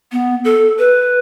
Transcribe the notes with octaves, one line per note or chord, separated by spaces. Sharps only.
B3
A4
B4